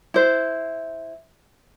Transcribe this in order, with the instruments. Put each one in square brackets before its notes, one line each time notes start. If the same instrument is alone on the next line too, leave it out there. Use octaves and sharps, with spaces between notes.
[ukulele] E4 C5